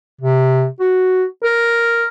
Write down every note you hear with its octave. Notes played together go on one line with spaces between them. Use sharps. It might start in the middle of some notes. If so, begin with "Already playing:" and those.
C3
F#4
A#4